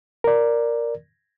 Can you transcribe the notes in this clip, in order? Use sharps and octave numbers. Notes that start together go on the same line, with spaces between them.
A#4 D5